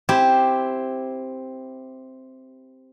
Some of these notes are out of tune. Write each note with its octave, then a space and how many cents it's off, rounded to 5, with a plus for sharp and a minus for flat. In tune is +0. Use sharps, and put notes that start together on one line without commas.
C4 +0 E4 +0 G4 +0